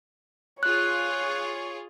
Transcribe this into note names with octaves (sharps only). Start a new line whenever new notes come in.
F4 G#4 C#5 F#6